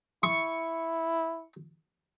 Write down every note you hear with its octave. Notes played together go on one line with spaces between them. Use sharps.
E4 C#6